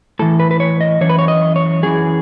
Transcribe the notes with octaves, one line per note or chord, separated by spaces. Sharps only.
A2 E3 A4
B4
B4
C#5
D#5
F#2 E3 C#5
B4
C#5
D#5
C#5
F#2 E3 G#4